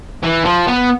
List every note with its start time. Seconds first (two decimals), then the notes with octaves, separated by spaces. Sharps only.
0.23 E3
0.45 F3
0.67 B3